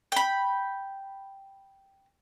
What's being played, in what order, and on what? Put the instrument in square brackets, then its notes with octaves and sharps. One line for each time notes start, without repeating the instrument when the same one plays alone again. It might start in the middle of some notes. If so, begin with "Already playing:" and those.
[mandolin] G5 B5